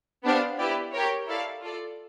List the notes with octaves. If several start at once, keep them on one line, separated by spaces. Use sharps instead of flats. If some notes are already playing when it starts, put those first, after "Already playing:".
B3 D4 G4 C5 F5
E4 G4 B4 D5
G4 A#4 C#5
E4 A4 D5 F5
F4 A4 D5